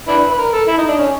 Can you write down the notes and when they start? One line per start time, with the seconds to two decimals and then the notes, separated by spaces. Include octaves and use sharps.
0.07 D4 E4 B4
0.30 B4
0.38 A#4
0.53 A4
0.68 E4
0.77 D#4
0.88 D4
0.98 C#4